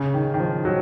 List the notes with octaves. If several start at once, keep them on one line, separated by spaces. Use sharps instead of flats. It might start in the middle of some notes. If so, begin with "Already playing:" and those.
Already playing: C#3
D#3
D#3
F3
F#3